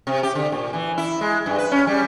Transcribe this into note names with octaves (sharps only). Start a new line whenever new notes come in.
C3
G4
D3
A#2
E3
E4
G#3
G2
B4
C#4
G3